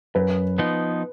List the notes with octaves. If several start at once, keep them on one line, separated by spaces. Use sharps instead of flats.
F#2 B4
F3 B3 D#4